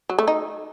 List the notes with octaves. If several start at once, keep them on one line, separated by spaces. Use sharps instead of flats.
F#3
A3
D#4